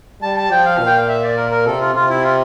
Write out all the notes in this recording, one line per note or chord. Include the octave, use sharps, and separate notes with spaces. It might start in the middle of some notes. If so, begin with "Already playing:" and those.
G3 A5
A5
F3 G5
F5
A#2
G5
F5
E5
D5
A#4
A#4
C3 A4
F4
C3 F4
E4
F4